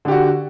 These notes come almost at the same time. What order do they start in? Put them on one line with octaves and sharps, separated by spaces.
D3 G4 F#4